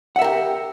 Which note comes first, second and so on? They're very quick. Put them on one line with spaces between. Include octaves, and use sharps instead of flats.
F#5 E5 A#4 G4